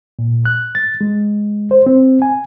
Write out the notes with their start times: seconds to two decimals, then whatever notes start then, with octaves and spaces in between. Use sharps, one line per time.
0.19 A#2
0.45 F#6
0.75 A6
1.01 G#3
1.71 C5
1.86 C4
2.22 G#5